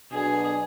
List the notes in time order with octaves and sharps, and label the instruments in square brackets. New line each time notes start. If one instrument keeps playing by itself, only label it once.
[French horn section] B2 F#3 B3 D4 [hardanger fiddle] G#4